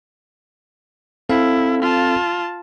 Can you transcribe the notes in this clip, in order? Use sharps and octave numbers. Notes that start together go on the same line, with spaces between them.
C4 E4 A4 F5
F4 A5